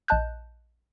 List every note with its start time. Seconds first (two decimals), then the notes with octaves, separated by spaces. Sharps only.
0.08 A#1 D#5 A5 F#6 G6